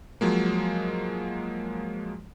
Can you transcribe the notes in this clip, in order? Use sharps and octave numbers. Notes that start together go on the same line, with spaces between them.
F3 F#3 G#3 A#3